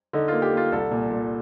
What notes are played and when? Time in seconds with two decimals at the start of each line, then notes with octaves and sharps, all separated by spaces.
0.13 D3 D#4
0.28 A#3 F4
0.42 G4
0.53 A#3 F4
0.72 C2 A4
0.91 A#2
1.11 A#2